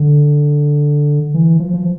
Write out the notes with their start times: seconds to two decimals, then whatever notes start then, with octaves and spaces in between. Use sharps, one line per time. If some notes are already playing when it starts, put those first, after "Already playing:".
Already playing: D3
1.34 E3
1.60 F3
1.74 F3